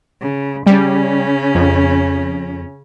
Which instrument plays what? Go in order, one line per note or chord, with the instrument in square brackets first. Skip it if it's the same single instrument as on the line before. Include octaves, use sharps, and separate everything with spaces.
[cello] C#3
[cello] C#3 C#4 [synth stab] G3
[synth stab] F2